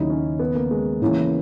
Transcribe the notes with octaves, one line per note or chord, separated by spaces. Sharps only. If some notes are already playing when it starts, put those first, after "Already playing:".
Already playing: D#2 C#3 F#3 D#4 E4
C#4
B3
A#3
G#3
C#3 E3 A#3 E4